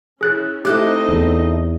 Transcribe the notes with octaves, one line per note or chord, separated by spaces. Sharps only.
C#4 E4 G#4 F#6 A6
A3 C4 D#4 E4 G4 A4 D#5 F#6
E2